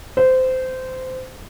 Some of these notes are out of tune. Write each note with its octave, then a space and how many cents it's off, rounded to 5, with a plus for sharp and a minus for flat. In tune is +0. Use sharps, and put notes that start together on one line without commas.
C5 -20